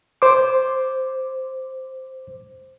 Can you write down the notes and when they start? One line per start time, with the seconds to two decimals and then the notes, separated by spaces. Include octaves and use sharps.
0.22 C5 D6